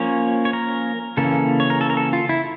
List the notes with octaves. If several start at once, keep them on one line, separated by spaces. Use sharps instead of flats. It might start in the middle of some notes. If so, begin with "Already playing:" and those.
Already playing: F3 A#3 C#4 C#5
C#5
A#4
C#3 E3 A#3 C#4 A4
C#5
A#4
A4
A#4
A4
F4
E4